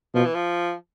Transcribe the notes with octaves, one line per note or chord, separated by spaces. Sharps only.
B2 F3
E3
F3